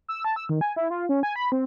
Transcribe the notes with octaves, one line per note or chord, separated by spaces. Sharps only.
E6
A5
E6
D#3
G#5
E4
F4
C#4
G#5
B5
C4